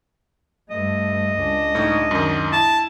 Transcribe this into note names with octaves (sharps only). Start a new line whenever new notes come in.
G2 A3 D#5
C#2 D4
A2 D#4
F#2 D#3
E4 A5